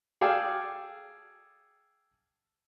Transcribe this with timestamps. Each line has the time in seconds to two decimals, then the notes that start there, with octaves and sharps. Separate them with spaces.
0.21 G#4 A4 D5 F5 G5 A5